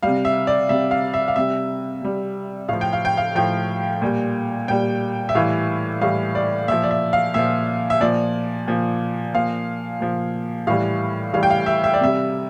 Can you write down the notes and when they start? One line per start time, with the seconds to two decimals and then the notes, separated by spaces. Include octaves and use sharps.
0.03 C3 G3 F5
0.25 E5
0.47 D5
0.69 C3 G3 E5
0.91 F5
1.14 E5
1.28 F5
1.36 C3 G3 E5
2.02 C3 G3
2.68 A2 F3 F5
2.81 G5
2.93 F5
3.05 G5
3.17 F5
3.35 A2 F3 G5
4.02 A#2 G3
4.68 A#2 G3 G5
5.29 E5
5.35 A2 E3 G3 F5
6.01 A2 E3 G3 F5
6.35 D5
6.68 A#2 F3 E5
6.83 D5
6.91 E5
7.13 F5
7.34 A#2 F3 E5
7.90 E5
8.01 A#2 F3 D5
8.67 A#2 F3
9.34 A#2 F3 F5
10.00 A#2 F3
10.67 A2 E3 G3 F5
11.33 A2 E3 G3 F5
11.43 G5
11.50 F5
11.66 E5
11.84 E5
11.94 D5
12.01 C3 G3 E5